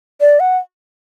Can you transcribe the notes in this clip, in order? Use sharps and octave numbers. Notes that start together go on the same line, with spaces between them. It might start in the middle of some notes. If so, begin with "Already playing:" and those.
D5
F#5